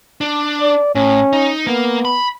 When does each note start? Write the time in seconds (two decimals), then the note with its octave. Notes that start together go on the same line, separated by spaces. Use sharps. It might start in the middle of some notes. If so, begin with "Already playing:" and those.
0.21 D4
0.61 D5
0.95 A2 C#4
1.33 D#4
1.67 A#3 B3
2.05 B5